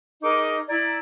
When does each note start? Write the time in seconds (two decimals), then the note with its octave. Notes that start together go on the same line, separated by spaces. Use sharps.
0.23 D#4 G#4 A#4 D6
0.69 E4 D5 A#5 G#6